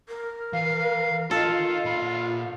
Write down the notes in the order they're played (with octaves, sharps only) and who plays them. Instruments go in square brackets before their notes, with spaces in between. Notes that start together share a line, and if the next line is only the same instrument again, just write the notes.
[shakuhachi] A#4
[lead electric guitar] E3 [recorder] F5
[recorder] F4 [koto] A4 [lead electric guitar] A#4 D#5 [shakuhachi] F5
[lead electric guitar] A#2 B5